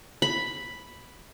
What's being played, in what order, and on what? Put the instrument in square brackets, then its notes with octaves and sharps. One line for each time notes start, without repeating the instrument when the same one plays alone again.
[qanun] B5